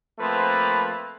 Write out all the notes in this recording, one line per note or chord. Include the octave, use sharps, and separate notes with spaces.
F3 A3 A#3 C4 B4